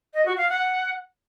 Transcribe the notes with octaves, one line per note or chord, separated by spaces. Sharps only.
D#5
F#4
F5
F#5